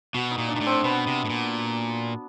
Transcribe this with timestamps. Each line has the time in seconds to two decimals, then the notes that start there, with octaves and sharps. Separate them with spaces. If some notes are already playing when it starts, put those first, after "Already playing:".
0.14 B2 F#4
0.31 D#4
0.38 A#2
0.49 D4
0.56 A#2
0.61 A2
0.66 C4
0.84 B2 B3
1.07 C3
1.25 A2
1.30 A#2